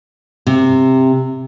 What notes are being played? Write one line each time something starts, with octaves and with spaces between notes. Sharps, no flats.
C3